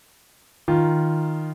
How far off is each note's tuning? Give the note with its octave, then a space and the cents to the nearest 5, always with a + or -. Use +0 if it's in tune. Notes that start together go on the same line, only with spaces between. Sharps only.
D#3 +0 F4 -10